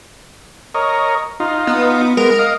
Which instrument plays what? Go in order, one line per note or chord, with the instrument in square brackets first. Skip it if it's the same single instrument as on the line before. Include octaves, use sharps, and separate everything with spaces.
[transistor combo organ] A#4 C#5 D#5
D#4 F4
[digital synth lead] B3
[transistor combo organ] G#3 B3 [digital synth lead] A#4
[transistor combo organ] D#5 F5